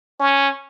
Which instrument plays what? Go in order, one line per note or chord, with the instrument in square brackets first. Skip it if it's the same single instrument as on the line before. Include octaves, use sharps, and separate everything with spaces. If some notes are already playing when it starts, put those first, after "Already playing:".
[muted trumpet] C#4